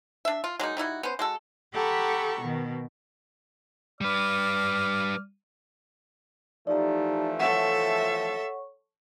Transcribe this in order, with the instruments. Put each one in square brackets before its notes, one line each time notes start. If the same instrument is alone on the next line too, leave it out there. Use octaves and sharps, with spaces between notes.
[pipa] D4 E5
F4
F#3 G#3 A#3 D#4
G3 D#4 E4 F#4
B3 C#4 C5
G#3 F#4 A4
[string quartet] G4 A4 F#5 A#5 B5 C#6
B2 D#3
[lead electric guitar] G3 B4 [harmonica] D5 F6
[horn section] E3 F3 A3 [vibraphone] D#4 G4 A#5 [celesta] D5
[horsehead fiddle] A4 E5 [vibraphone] C#5 C#6 [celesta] F#5